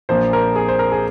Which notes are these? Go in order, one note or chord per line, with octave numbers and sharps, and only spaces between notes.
A#1 A#2 F3 A#3 C5
A#4
G#4
C5
A#4
G#4